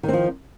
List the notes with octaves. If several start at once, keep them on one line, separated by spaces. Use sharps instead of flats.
D#3 F3 C4